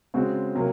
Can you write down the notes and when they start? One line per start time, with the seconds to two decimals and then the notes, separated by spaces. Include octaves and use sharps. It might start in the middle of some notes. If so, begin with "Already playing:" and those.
0.14 C#3 G#3 C4 F#4
0.55 C3 F#3 A#3